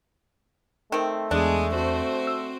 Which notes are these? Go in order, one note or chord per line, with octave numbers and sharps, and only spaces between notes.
D#3 A3 C4
E2 G#3 B3 D4 G#4
C4 F#4 C5
E6